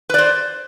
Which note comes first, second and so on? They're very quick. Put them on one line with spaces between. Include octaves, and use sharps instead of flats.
B4 D5 C5